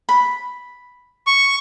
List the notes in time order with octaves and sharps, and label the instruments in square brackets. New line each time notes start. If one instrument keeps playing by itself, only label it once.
[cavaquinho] B5
[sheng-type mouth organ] C#6